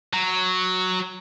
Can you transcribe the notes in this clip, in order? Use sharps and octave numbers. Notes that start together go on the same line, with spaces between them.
F#3